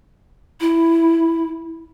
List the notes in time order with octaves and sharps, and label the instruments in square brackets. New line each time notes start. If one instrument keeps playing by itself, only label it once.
[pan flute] E4